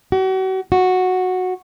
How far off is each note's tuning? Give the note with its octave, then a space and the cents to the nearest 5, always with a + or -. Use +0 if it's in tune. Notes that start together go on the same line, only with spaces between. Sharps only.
F#4 +40
F#4 -10